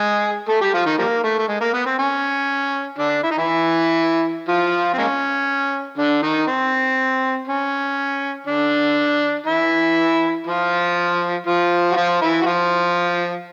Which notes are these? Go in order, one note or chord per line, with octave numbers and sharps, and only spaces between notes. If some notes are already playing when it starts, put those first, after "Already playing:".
Already playing: G#3 G#4
A3 A4
G3 G4
F3 F4
D#3 D#4
F3 G3 A#3
A3
A3
G#3
A#3
B3
C4
C#4
D3 D4
E4
D#4
E3 E4
F3 F4
C4
G#3 A#3 C#4
D3 D4
D#3 D#4
C4
C#4
D3 D4
E3 E4
F3 F4
F3 F4
F#4
F3 F4
E3 E4
F#4
F3 F4